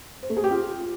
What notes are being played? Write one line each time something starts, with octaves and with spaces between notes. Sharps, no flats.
C5
A3
G#4
G4
F4